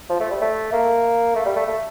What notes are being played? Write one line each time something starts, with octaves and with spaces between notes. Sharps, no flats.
F3
A3
G3
A3
A#3
A3
G3
A3
A3